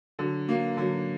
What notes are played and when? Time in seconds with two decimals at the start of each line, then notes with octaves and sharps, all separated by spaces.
0.19 D3 F#3
0.48 F#3 A#3
0.77 D3 F#3